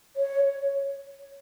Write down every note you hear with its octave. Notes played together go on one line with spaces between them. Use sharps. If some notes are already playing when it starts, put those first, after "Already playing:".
C#5